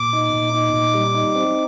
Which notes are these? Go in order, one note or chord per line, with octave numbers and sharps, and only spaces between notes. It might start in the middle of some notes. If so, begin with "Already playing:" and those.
Already playing: A#2 D6
D#4
A#2
D#4
A#2
G3
D#4
C4